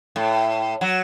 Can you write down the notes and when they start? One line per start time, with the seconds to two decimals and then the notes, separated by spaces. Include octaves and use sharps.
0.16 A2
0.81 F#3